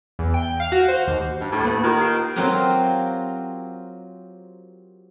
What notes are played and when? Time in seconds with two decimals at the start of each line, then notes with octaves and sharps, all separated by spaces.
0.19 E2
0.34 G5
0.60 F5
0.72 F#4
0.88 C5
1.08 D#2
1.41 G2
1.52 A2
1.64 A#3 F5
1.84 D#3 F4 G4
2.01 C7 D7
2.36 F#3 C4 F4 G4 A#4